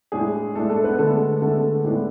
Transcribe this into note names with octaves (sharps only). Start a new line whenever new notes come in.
A2 G#3 D4 G#4
A2 G#3 A3 D4 A4
A3 A4
B3 B4
D3 G#3 A3 B3 A4
D3 G#3 A3 B3 A4
A2 G#3 B3 D4